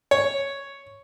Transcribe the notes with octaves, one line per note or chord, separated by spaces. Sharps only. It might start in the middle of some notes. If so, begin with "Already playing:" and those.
C#5